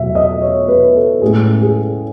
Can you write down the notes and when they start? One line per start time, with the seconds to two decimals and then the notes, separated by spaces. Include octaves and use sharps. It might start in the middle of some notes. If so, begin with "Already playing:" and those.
Already playing: E2 B2 F#3 E5
0.15 D#5
0.42 C#5
0.68 B4
0.96 A4
1.22 A2 G#3 C#4 G#4
1.61 G#4